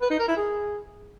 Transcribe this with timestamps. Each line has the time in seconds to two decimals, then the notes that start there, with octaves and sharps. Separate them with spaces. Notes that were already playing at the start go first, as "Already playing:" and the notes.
0.01 B4
0.10 D#4
0.19 A#4
0.28 E4
0.37 G#4